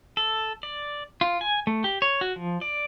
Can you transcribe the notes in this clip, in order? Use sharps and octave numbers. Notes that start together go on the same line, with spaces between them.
A4
D5
F4
G#5
A3
G4
C#5
F#4
F3
D5